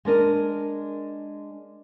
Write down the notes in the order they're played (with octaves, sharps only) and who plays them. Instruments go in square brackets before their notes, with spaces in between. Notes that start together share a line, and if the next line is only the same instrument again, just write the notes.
[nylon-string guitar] G#3 D4 A#4 D#5